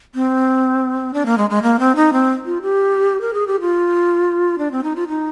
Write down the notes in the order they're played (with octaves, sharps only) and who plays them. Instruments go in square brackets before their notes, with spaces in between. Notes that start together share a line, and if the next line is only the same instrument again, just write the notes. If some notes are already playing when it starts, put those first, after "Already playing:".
[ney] C4
D4
A#3
G#3
G#3
A#3
C4
D#4
C4
F4
G4
A#4
G#4
G4
F4
D4
C4
D#4
F4
D#4